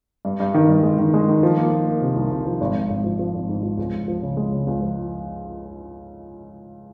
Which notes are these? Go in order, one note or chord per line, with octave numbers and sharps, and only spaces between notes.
G2
G2
D#3
G2
G#3
D#3
G#3
D#3
F3
A#3
A#3
A#3
C3
C2
C3
F3
G#1
G#1
G#1
F3
F3
G#1
G#2
F3
C#2
C#2
F3
C#3
G#3
C#3
C#2
F3